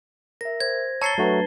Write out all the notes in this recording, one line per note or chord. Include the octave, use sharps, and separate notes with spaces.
A#4 E5 A#6
C5 G#6
C#5 A5 A#5 E6 A6 C7 C#7 G7
F#3 A3 D4 F#4 B4